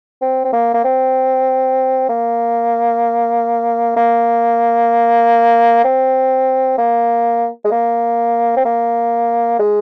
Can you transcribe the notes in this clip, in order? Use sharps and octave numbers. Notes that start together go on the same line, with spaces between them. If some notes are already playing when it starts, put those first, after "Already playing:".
C4
C4
A#3
A#3
C4
A#3
A#3
C4
A#3
G#3
A#3
C4
A#3
G#3